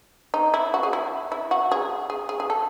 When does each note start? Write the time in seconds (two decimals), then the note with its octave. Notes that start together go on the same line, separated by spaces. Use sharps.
0.34 D#4
0.54 E4
0.74 F#4
0.83 G#4
0.93 E4
1.32 E4
1.51 F#4
1.72 G#4
2.10 G#4
2.29 G#4
2.40 G#4
2.50 A4